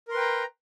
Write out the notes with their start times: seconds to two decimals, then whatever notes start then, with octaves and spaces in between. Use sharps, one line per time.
0.08 A#4
0.11 C6
0.14 B4
0.17 G5
0.20 A#5